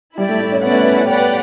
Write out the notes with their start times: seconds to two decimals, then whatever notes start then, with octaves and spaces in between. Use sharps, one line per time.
0.17 G3 E4 G4 D5
0.29 A3
0.40 A3
0.52 C#4
0.63 B3 C#4 E4 B4 D5 F#5
0.72 A3
0.82 B3
1.09 G4 B4 D5 F#5